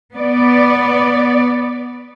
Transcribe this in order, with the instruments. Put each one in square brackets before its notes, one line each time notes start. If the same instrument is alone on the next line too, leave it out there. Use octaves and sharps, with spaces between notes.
[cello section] B3 D5